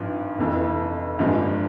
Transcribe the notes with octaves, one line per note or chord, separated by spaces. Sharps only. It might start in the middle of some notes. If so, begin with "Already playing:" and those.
Already playing: G#1 G2 F3
F1 F2 E3
G1 G2 F3 G#3